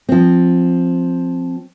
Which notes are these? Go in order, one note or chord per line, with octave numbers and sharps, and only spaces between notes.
F3 C4